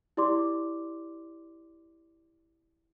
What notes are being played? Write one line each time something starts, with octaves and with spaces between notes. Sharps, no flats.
E4 G4 D5 C6 D6